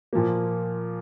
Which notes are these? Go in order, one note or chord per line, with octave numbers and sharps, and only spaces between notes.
A#2 F3 A#3